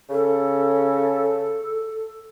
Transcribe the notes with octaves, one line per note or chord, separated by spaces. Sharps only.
C#3 A4